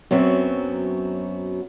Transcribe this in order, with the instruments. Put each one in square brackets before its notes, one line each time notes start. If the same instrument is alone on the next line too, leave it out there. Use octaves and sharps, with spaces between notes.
[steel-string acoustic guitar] F#2 F#3 B3 C4 F#4